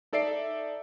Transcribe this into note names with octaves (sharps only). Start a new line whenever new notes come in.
D#4 A4 D5 E5 C7 D7